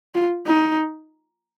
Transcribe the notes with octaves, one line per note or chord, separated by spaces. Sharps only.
F4
D#4